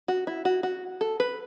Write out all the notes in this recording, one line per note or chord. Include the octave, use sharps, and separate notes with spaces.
F#4
E4
F#4
F#4
A4
B4